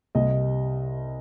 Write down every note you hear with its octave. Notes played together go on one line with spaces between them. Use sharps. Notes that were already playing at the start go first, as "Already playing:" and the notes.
C2 D#5